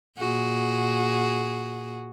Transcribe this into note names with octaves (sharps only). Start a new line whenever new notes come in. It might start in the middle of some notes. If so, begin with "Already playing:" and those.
A#2 F#4 G#4